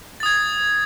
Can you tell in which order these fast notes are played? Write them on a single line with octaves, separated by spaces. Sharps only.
A6 D#6 G#6